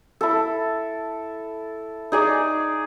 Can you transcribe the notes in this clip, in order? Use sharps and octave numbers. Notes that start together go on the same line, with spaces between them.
E4 A4
D#4 G#4 D5